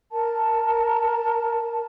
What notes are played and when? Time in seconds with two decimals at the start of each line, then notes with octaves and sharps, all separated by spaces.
0.11 A#4 A5